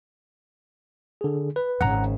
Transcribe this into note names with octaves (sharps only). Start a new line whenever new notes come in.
D3 G#4
B4
G#1 C#3 F#5 A#5